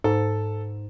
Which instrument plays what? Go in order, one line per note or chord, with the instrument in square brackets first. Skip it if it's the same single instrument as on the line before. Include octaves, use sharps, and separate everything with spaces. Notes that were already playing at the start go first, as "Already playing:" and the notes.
[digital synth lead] G#2 [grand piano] A4